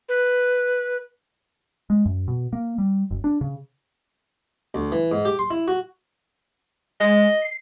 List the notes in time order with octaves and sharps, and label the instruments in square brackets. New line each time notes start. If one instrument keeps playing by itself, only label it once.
[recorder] B4
[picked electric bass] G#3
F#2
B2
A#3
G3
F#1
D4
C#3
[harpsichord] D2
E3
G#2
G4
C6
E4
F#4
[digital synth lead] G#3 [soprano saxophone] D#5
[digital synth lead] C7